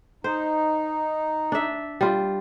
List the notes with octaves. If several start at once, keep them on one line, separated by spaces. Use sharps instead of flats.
D#4 C5
D4 E5
G3 F4